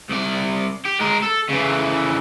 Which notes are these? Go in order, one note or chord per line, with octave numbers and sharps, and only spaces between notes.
C2 D5
G4
G#3 A#4
A4
C#3 E3